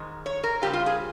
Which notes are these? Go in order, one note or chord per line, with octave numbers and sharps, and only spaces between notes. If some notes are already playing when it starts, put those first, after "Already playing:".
Already playing: G#2 D#3 G#3
C#5
A#4
C#3 G3 C4 F4 G4
F4
G#4